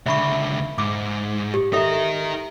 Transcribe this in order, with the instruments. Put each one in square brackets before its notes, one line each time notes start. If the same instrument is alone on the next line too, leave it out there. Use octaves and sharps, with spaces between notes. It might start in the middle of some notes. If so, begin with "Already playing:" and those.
[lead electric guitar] C#2 D3 [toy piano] E5 B5 C#6
[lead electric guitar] G#2 [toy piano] D6
[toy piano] G4
[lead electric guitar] D#4 A#4 [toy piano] A4 E5